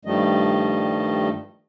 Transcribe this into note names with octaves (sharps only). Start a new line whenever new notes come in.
G2 D#3 F3 G3 A3 D#5